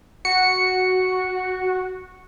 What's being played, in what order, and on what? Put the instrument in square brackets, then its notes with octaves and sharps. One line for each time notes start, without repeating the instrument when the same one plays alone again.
[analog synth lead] F#4 [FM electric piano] C#7